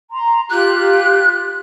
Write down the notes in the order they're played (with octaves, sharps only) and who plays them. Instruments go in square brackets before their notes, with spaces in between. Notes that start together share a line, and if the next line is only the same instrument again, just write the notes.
[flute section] A#5 C6
[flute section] F4 G4 [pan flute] F#6